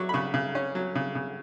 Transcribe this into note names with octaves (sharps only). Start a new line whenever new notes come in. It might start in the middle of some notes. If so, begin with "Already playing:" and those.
Already playing: F#3 C#6 D6
B5
C#3 C#6
C#3
C#4
F#3
C#3
C#3